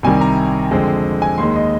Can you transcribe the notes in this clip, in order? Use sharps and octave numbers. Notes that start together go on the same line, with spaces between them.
C2 C3 D#3 G3 G#5
A#5
F2 D3 G#3 C4
G#5
D#2 D#3 G#3 C6
D#5